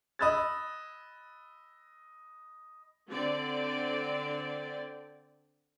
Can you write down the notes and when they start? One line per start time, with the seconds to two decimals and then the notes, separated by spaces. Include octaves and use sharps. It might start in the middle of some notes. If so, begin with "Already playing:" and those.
0.19 D#5 B5 E6 F#6 A6
3.10 D3 C4 D5